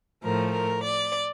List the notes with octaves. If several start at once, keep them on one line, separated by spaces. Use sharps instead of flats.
A2 F3 A3 A#4
A#4
D5